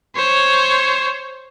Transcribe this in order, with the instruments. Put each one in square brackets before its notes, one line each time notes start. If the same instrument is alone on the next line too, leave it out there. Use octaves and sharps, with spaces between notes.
[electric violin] C5 C#5